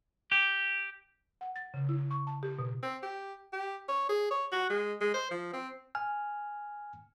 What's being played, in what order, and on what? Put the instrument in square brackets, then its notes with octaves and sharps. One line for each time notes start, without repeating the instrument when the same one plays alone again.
[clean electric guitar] G4
[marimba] F#5
A6
C#3
E4
C#6
A5
G4
B2
[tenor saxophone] C4
G4
G4
C#5
G#4
C#5
F#4
G#3
G#3
C5
F3
C4
[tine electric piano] G#5 F6